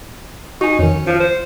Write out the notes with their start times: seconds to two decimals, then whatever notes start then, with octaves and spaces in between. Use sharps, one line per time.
0.61 D#4 F#4 G#5
0.79 F2 D#3 C#4
1.06 F3 F6 C#7
1.20 C5